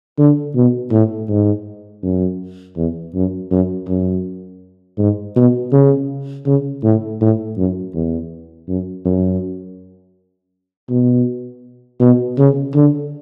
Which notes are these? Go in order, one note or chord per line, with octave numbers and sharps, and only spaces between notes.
D3
B2
A2
G#2
F#2
E2
F#2
F#2
F#2
G#2
B2
C#3
C#3
A2
A2
F#2
E2
F#2
F#2
B2
B2
C#3
D3